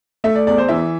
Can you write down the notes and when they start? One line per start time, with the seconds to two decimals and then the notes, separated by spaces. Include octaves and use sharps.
0.24 A3 E5
0.35 D5
0.47 E2 D5
0.58 C5
0.68 E3 E5